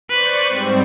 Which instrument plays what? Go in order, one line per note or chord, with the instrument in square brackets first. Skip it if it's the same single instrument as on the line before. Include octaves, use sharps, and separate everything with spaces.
[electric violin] B4 [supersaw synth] C5 D5 C#6
[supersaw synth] G#2 G3 C4